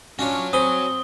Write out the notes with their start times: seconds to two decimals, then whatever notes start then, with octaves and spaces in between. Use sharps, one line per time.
0.19 C#4 D4 F4 F#4 C#5
0.53 C4 G#5 B5 D#6 G7